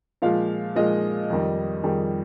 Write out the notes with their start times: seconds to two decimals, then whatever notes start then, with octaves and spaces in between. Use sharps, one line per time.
0.22 A#2 F3 G#3 F5
0.75 A#2 F3 G#3 D#5
1.30 F2 D#3 G3
1.83 F2 D#3 G3 G#4